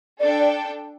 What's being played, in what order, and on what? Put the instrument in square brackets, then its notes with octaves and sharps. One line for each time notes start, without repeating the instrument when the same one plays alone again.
[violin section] D4 A4 G5 [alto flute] D5
[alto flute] D5